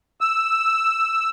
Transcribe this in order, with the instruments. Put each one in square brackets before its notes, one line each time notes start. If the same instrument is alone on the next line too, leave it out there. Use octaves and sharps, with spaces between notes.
[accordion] E6